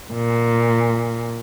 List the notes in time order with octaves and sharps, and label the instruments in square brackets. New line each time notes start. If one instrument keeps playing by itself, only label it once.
[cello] A#2